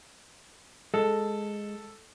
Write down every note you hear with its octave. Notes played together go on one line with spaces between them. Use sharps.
G#3 A4